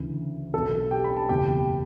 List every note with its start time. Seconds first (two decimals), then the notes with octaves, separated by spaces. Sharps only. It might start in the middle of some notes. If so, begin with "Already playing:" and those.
Already playing: D2 C#3 E3
0.53 B1 B2 A4 A5
0.91 G4 G5
1.04 B5
1.17 A5
1.29 F#1 E2 B2 G4 G5